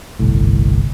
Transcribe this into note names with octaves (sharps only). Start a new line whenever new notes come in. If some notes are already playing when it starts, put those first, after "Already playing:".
G1 C2 A2